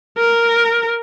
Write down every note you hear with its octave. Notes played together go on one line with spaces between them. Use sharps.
A#4